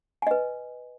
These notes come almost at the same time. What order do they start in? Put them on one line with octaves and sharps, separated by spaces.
G#5 D#5 B4